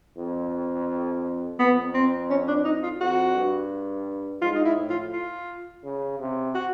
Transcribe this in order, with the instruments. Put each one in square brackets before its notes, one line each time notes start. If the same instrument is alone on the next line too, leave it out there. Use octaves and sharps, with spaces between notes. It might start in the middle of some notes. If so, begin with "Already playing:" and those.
[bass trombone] F2
[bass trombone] F2 [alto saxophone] B3
[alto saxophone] C4
C#4
D4
D#4
F4
[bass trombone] F2 [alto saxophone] F#4
[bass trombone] G2
[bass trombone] G#2 [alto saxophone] F4
[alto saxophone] D#4
E4
[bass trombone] A2
[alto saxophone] F4
F4
[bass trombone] C#3
C3
[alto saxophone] F#4